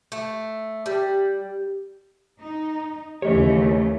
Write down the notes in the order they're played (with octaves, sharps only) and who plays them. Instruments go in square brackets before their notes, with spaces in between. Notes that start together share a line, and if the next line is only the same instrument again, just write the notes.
[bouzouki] A3
G3
[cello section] D#4
[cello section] D#2 C#3 E3 [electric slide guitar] A3 C#5 [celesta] G4 D#5